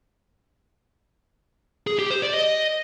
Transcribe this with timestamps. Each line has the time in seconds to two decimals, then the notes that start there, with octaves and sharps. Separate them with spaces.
1.87 G#4
1.99 G4
2.10 C5
2.22 D5
2.34 D#5